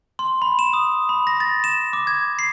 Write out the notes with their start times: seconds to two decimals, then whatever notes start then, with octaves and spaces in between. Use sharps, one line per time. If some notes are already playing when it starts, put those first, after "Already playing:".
0.19 C6
0.42 B5
0.59 E7
0.73 D#6
1.09 B5
1.27 A#6
1.40 A6
1.64 E7
1.93 D6
2.07 G#6
2.39 C7